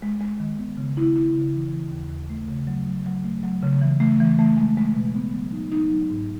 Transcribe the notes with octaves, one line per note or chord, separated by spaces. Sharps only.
G#3
G#3
D#3
B3
C#3
E4
E4
C#3
E3
E3
D#2
D#2
A3
C#3
F#3
F#3
F#3
A3
F#3
C#3
E3
A3
E3
A3
G#3
G#3
B2
B3
F#3
D#4
D#4
F#3
G#2